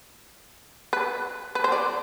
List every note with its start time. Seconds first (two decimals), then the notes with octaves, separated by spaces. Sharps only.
0.93 B4
1.55 B4
1.64 C5
1.72 D5